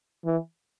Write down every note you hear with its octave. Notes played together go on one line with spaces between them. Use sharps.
E3